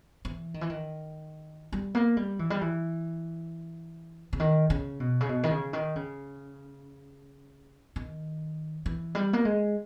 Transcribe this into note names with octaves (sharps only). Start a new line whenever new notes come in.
E3
D#3
E3
D#3
G3
A#3
G3
E3
G3
E3
C#3
D#3
C#3
B2
C#3
B2
D#3
C#3
D#3
C#3
D#3
E3
G3
A#3
G#3